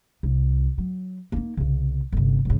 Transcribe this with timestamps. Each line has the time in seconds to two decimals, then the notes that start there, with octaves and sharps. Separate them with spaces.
0.23 C2
0.78 F#3
1.32 A#3 D#4
1.57 C2 C#3
2.12 G1 C3
2.45 G#2 C#3